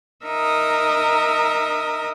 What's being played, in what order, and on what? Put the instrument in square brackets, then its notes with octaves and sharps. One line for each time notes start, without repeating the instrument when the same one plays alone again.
[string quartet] D#4 A#4 E5 A#5 D#6